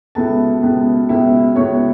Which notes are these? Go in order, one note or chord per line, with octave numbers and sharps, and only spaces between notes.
C#2 B2 B3 E4 A4 A5
C#2 B2 B3 E4
C#2 B2 B3 E4
C#2 B2 B3 E4 C#5 C#6